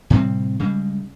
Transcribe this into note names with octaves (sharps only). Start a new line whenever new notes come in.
A2 C3 G3 C4
C#3 G3 G#3